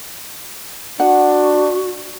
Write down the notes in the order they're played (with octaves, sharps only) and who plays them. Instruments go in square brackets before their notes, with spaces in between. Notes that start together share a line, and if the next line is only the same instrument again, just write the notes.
[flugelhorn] D4 [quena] F#4 [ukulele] F#5